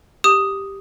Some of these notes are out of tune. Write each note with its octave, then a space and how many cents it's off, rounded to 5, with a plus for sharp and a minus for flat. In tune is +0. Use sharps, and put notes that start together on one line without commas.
G4 +0 D#6 +0